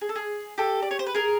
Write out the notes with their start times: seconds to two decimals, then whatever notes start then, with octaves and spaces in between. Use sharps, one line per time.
0.01 G#4
0.09 A4
0.15 G#4
0.58 G4 A4
0.82 D5
0.91 C#5
0.99 C5
1.06 B4
1.15 G#4 A#4